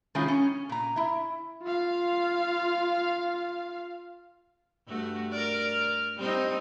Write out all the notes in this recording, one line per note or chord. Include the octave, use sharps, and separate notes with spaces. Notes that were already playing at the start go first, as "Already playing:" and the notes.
D#3 G#3 A3 C#4 E4 F4
C#4
A#2 A#5
E4 E5
F4 F5
G2 A3 F#4
A#4 D5 F6
G3 C4 D#4